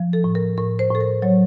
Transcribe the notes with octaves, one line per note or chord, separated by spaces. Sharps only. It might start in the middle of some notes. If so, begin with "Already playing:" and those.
Already playing: F3
A4
A2
A#4
A2 A#4
C5
A2 A4
A#4
F#3 C#5